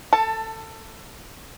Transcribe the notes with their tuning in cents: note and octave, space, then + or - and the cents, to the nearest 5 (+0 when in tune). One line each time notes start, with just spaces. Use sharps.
A4 +20 A5 +0